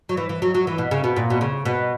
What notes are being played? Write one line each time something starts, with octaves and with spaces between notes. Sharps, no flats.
F#3
E3
E3
F#3
F#3
E3
B2
C#3
B2
A#2
B2
C#3
B2